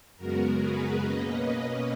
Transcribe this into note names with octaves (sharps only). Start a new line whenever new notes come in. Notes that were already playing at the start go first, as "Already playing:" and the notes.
F#2 C#3 G#3 B3 F#4 A#4
G#4 B4
B2 A#3 C#4 B4 D#5